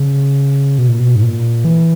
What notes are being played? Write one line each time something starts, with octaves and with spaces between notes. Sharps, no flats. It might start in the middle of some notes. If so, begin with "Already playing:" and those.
Already playing: C#3
B2
A#2
B2
G#2
A#2
E3